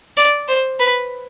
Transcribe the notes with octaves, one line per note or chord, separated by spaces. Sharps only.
D5
C5
B4